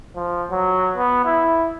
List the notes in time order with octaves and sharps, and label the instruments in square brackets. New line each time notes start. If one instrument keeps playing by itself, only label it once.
[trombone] F3
F#3
B3
E4